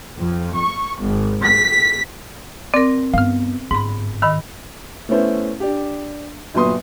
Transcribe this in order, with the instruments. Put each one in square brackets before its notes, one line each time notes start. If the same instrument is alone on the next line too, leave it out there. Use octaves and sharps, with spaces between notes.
[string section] F2
C#6
G#1
B6
[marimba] C4 A#4 [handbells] D5 D6
[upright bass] G2 B3 [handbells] F5 F6
[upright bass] G1 [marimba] G#2 B5
[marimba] D#3 [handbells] D#5 B5 E6
[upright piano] A3 B3 C#4 E4 C5
D4 G4
G1 A#2 F#3 B4 C6 D#6